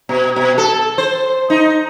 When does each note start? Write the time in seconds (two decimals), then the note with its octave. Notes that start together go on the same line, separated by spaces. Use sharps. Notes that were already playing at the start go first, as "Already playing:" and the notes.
0.09 B2
0.36 B2
0.58 A4
0.98 C5
1.50 D#4